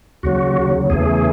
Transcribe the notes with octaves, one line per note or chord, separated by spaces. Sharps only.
D#2 C#3 F#3 F#4
E2 C#3 E3 A3 G#4